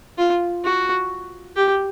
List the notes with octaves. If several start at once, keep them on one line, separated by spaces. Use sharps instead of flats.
F4
F#4
G4